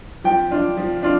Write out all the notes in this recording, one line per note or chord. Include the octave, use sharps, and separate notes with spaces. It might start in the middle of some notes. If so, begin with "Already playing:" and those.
F3 G5
D4 F4
F3
D4 F4